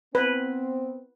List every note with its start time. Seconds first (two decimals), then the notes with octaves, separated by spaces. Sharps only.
0.15 B3 C4 B4